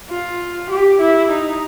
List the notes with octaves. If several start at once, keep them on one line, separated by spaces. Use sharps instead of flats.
F4
G4
E4
D#4